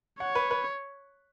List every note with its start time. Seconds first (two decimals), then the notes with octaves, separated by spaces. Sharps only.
0.20 C#5 F#5
0.35 B4
0.51 B4